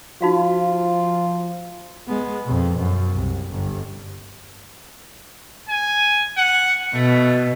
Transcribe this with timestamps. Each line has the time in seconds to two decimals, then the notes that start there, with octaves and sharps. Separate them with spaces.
0.22 F3 D#4 F4 F#4 F5
2.07 G#3 B3
2.44 F2 B2
2.79 F#2
3.12 C2
3.51 G1
5.69 G#5
6.37 F#5
6.94 B2 A3